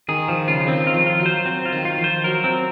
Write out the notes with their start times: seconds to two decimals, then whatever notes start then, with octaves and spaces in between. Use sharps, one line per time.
0.08 D#3 G#4
0.28 F3
0.48 C#3 F4
0.68 D#3 C4
0.87 F4
0.94 F3
1.06 F4
1.20 F#3
1.26 C5
1.46 C4
1.66 F4
1.72 D#3
1.85 F4
1.98 F3
2.04 C5
2.24 F#3 A#4
2.44 C4